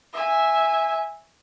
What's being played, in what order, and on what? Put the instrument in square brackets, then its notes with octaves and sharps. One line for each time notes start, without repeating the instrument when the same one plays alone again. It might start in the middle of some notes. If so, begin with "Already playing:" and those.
[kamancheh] E5 G#5